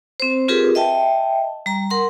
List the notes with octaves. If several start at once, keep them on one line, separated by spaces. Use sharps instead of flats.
C4 C5
C4 F4 G4 G#4 A#4 B4
D#5 E5 G5 A5
G3 A#5
A#4 F#5 C6